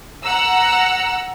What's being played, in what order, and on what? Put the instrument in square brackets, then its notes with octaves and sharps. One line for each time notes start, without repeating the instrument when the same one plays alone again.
[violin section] F#5 A#5 E6